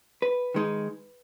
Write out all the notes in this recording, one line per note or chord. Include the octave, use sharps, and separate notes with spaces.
B4
D#3 G#3 D#4